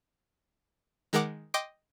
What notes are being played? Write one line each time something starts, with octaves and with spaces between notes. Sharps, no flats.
D#3 G#3 A#4 F#5 D6
D#5 G5 C6 D6